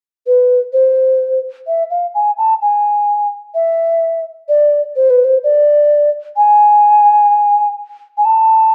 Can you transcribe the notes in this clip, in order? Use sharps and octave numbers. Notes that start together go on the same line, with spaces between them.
B4
C5
E5
F5
G#5
A5
G#5
E5
D5
C5
B4
C5
D5
G#5
G#5
A5